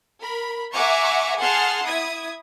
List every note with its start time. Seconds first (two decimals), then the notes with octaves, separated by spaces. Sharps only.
0.20 A#4 B5
0.73 E5 F#5 G#5 A#5 C#6 D6
1.39 G#4 F#5 A5 C6 F6 C7
1.83 E4 D#6 G#6